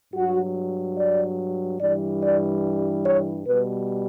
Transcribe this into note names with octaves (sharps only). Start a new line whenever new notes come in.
G2 F#3 F#4
D5
G2 E3 G3 D5
D5
C#5
B2 G3 B4